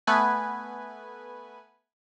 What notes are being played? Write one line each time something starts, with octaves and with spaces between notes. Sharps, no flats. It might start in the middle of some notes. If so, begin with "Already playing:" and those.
A3 B3 B4 G#5